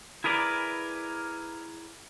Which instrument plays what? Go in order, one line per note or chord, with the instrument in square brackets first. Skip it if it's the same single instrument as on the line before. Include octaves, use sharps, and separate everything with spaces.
[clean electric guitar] E4 G#4 A#4 B4 D5